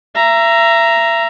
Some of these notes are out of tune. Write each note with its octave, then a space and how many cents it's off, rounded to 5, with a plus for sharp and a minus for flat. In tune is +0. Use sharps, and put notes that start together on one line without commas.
E5 +30 A#5 +0